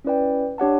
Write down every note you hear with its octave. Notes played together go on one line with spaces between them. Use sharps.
C#4 E4 B4 D5 G5
D4 G4 C#5 F#5 A5